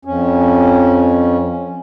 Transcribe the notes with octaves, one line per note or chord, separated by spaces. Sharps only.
F2 C#4